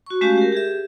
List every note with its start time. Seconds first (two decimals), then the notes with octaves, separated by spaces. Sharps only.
0.06 F#4 C#6
0.21 G#3 A3 C#4 F#4 G4 F5
0.38 G4 A#4
0.52 G4 G#4 E5